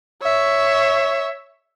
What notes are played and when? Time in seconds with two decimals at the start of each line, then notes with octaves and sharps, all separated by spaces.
0.23 C#5 E5